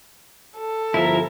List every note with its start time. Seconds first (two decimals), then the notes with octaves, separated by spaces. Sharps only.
0.58 A4
0.94 G1 F3 E4 A#4 E5 A#5